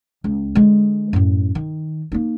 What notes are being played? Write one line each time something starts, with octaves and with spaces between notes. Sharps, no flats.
C#2
D3 G#3
F#2 A2
D#3
A#3 D#4